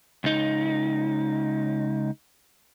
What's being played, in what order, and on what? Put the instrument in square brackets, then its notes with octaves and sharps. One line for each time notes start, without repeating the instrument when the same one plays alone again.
[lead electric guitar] C#2 D#4